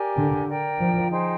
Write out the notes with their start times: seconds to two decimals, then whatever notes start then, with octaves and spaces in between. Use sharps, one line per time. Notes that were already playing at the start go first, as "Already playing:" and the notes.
Already playing: G4 A#4 D5 G#5
0.17 D3
0.48 A#4 D5 G5
0.80 F3
1.09 D#4 G#4 C5 G5